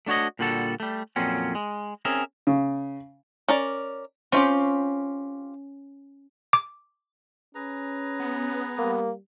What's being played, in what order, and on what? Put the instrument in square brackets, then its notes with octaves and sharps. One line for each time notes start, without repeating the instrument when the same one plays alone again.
[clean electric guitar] A3 D4 F#4 C#5 D#5
A#2 D3 G3 F#4 A4
G3 A3
F2 A#2 F#3 C4 C#4
G#3
C4 C#4 G#4 A#4 E5
[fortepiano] C#3
[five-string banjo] C#4 A#4 D5
[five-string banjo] C4 F4 G4 [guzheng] C#4
[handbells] D6
[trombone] C#4 [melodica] G#4 B4 A#5
[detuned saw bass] B3
[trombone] G3 [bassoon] A#3